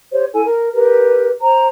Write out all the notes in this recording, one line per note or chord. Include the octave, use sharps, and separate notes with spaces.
G4 C5 C#5
E4 A4 G#5
A#4
G4 A#4 B4
C5 A#5